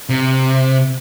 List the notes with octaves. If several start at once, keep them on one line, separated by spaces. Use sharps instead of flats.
C3